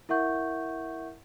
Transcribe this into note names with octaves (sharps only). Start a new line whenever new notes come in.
E4 A#4 E5 F#5 C#6 G6